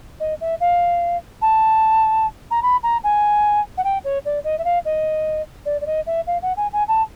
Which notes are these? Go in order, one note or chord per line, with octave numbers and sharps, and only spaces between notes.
D#5
E5
F5
A5
A#5
B5
A#5
G#5
F#5
G5
C#5
D5
D#5
E5
F5
D#5
D5
D5
D#5
E5
F5
F#5
G#5
G#5
A5